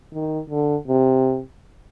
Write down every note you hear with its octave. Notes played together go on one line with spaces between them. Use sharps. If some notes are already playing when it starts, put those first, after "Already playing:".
D#3
D3
C3